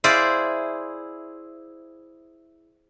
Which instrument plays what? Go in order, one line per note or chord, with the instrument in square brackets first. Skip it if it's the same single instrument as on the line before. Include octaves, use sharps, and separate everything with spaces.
[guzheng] E4 G#4 C5 D5 F5